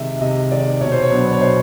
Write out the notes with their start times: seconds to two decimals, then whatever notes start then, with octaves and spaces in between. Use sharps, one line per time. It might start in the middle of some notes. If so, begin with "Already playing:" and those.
Already playing: C3 D#3 G#3 E5
0.21 C3 D#5
0.51 D#3 G#3 D5
0.81 B2 C#5
0.92 C5
1.03 C#5
1.11 F#3 B3 D4
1.33 C#5
1.41 B2 C5